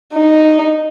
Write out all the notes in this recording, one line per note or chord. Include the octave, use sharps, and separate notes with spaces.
D#4